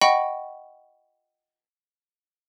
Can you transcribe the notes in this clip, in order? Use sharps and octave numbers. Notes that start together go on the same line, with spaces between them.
D#5 F#5 G5 B5 C#6